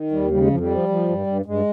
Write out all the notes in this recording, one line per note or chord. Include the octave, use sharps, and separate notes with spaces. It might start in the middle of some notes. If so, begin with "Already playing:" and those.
Already playing: D#3
D#2 G3
C#3 G3
G#3
F2 F3
G3
F3
F3
G2
G2
G2 G#3